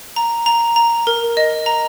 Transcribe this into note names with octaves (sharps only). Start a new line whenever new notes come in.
A#5
A#5
A#5
A#4
D#5
A#5